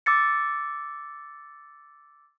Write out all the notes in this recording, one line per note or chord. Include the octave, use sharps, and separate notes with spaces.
D6 E6 A6 C#7